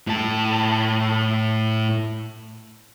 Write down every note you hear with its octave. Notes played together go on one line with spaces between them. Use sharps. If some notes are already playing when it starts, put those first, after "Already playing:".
A2 A5